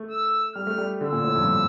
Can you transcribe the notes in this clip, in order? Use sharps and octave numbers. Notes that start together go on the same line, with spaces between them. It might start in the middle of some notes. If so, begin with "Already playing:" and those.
Already playing: A3
E6
G3 F6
A3
G3
D3 E6
A#2
A2
F2
G2